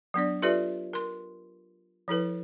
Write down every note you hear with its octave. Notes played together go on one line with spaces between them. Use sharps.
F#3 B3 D4 D5
F4 G4 A4 B4 D5 E5
A#4 C6
F3 E4 A4 B4